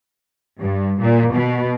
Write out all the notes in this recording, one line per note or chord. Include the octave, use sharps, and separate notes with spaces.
G2
A#2
B2